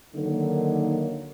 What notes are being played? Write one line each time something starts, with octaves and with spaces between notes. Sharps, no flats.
D3 D#3 F#3 A#3 D#4